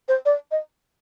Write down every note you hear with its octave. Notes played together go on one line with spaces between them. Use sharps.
C5
D5
D#5